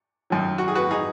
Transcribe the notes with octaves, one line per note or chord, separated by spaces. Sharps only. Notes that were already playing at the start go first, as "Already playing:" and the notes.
F#2 D#3 F#3
F#4
G#4
F#4 B4
D#4 G#4